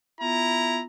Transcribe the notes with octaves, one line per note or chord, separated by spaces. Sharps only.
B3 E4 F4 A#5